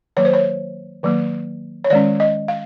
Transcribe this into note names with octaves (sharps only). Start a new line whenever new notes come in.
D#3 F#3 A#3 C#5
C5
C#5
D#3 F#3 A#3
C#5
D#3 G#3 C#4 D5
D#5
F5